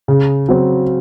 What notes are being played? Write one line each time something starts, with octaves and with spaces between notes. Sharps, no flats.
C#3
F#3 C4